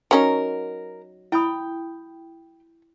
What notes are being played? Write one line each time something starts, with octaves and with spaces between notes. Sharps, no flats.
F#3 C#4 D#4 A#4
E4 G5 B5 D#6